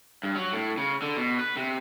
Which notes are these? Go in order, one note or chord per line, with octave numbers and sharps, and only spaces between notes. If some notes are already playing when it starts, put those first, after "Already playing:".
G2
F#3
A2
C#3
D3
B2
B4
C3